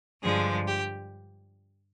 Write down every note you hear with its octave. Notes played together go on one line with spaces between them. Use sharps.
G2 D3 F3 G#3 G#4
G4